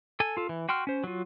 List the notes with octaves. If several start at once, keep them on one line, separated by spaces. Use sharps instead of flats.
A4 G#5
F4 A4
E3
F#4 G5 C6 F6
C#4 C5
F#3 F4